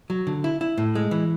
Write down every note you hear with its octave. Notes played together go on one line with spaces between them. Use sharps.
F#3
D3
E4
E4
A2
G#3
E3